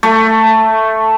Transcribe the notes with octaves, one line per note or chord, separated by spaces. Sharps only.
A3